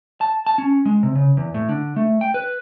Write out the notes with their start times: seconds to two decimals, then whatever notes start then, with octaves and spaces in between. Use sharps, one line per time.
0.21 A5
0.47 A5
0.58 C#4
0.85 G#3
1.03 C3
1.15 C#3
1.37 E2
1.54 A2
1.69 D3
1.96 A3
2.21 G5
2.34 B4